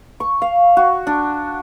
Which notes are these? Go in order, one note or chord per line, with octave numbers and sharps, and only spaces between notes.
C#6
F5
F#4
D4